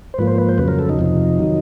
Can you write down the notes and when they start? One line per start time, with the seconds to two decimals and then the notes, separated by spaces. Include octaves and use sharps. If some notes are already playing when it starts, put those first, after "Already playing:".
0.14 C5
0.18 G#2 F3 A#3 B4
0.27 C5
0.38 B4
0.49 C5
0.58 F2 C#3 F#3 B4
0.68 A#4
0.79 A4
0.89 D#4
0.99 F2 C3 F3
1.39 D#3 F#3